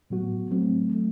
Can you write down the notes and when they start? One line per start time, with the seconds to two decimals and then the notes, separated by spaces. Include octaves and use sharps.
0.10 A2 F#3 B3 F#4
0.51 F#3 A3 C4
0.92 F#3 A3